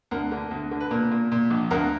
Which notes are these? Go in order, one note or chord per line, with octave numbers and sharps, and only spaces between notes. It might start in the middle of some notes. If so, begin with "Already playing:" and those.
D2 A#4
D3
D2
D3
B4
A#2 A#4
A#2
A#2
A#1
D2 A#4